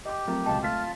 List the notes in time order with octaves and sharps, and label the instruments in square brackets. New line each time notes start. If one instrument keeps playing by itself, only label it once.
[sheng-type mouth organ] G4 [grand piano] D#5 D6
[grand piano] F3 A3 A#4 [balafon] F#3 C4
[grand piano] C#2 B2 G#3 [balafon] D#5 G5 [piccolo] A5
[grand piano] A3 B6 [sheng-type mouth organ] F4 A5 [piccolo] F6